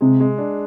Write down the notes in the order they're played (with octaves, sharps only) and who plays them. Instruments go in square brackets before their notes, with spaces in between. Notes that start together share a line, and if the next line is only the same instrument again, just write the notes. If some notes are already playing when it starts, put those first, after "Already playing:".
[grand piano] C3 [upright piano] G#3
[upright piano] G#3
D4